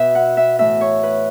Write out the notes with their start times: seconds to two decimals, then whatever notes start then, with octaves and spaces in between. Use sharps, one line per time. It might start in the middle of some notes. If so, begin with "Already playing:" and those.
Already playing: B2 B4 E5
0.15 F#5
0.37 E5
0.59 A2 E3 E5
0.81 C#5
1.03 B4